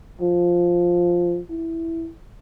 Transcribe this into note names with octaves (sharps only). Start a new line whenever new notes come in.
F3
E4